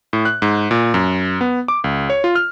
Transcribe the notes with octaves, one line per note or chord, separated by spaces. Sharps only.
A2
F#6
G#2
A#2
F#2
B3
D6
C#2
C#5
F4
F6